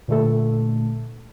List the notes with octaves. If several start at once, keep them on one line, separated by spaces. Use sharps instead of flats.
A#2 D3 A3 A4